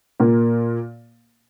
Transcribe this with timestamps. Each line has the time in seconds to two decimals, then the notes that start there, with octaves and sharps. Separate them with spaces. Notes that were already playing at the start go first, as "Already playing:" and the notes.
0.20 A#2 A#3